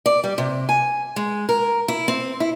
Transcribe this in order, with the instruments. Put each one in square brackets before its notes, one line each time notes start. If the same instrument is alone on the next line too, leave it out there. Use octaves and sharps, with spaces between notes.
[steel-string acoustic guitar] D5
G3
C3
G#5
G#3
A#4
E4
C4
E4